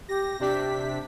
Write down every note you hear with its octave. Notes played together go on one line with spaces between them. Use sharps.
G4 A#6
C3 D4 G4 B6